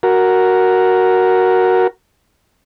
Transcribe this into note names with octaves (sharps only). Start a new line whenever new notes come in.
F#4 A#4